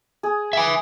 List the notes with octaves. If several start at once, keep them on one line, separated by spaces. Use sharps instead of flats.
G#4
E5 G#5